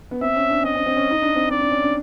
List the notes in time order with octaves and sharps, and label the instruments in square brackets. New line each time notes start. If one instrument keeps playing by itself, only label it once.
[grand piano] B3
[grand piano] C4 [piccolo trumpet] E5
[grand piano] C#4
D4
[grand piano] C4 [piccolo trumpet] D#5
[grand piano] C4
C4
C#4
D#4
D4
C4
[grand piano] C4 [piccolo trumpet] D5
[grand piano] D4
C#4
D4